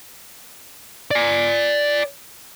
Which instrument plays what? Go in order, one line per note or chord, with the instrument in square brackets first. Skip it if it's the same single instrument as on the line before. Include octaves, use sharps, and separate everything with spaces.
[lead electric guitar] D5 G#5